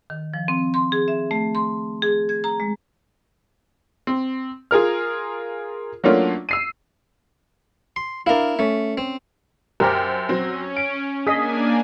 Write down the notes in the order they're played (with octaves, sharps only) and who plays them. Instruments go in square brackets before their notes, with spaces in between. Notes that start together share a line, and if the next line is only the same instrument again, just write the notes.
[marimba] D#3
F3
C4
C6
G#4
E5
A3
C6
G#4
G#6
A#5
G#3
[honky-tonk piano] C4
F4 G#4 A#4 F6
F#3 A3 A#3 C#4 D4 F4
E6 C7 D#7
[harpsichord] C6
[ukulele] D4 F5 [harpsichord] E4 A#4
[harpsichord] A3 [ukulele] C#4
[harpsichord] C4
[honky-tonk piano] F#2 C5 G5 [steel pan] G4 A#4
[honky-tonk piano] F#3 C4 [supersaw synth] C#4
[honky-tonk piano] D7
[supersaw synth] A#3 D4 G#5 [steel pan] G#4 D#5 [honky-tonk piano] D#6 B6